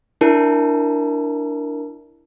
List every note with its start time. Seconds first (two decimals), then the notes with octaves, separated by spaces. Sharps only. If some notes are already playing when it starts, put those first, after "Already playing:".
0.21 D4 E4 A#4 A5